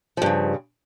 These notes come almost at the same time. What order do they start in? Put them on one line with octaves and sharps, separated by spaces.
F3 G2 C#3